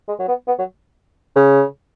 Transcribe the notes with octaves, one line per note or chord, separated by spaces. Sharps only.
G#3
F#3
B3
B3
F#3
C#3